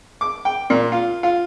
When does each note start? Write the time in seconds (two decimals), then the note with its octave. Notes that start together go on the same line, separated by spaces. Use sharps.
0.21 D6
0.45 G5
0.70 A#2
0.92 F4
1.23 F4